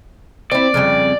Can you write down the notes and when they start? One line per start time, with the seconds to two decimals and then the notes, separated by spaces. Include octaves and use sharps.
0.52 C4 E4 D5
0.74 F2 C#3 G3